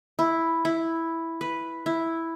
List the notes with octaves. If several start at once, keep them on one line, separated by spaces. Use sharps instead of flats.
E4
E4
B4
E4